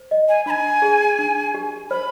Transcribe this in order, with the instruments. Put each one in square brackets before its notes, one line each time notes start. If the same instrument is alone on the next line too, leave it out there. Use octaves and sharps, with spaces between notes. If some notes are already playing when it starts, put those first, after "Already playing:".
Already playing: [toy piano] C5
D#5
[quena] G#5
[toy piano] D4 [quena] B5
[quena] G#5
[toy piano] G#4
D4
G4
[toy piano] C5 [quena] B5